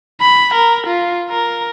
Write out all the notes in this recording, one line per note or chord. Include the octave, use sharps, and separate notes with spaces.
B5
A#4
F4
A#4